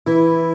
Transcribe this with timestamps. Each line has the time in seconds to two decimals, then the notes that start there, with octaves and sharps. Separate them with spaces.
0.06 E3 E4